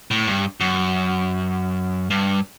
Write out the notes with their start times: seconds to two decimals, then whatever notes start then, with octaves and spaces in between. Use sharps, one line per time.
0.11 A2
0.27 G2
0.60 F#2
2.10 G2